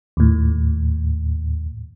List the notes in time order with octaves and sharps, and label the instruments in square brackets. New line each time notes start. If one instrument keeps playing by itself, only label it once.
[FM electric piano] D#2 A2